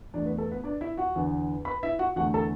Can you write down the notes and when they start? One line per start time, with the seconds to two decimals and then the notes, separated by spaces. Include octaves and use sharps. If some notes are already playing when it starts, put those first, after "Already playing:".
0.14 E2 E3 A3 D4 D5
0.26 B3 B4
0.38 A4
0.51 B3 B4
0.64 D4 D5
0.81 E4 E5
0.97 F#4 F#5
1.16 E2 D3 B3
1.65 B4 B5
1.83 E4 E5
1.99 F#4 F#5
2.16 E2 D3 A3 F#4 F#5
2.34 A4 A5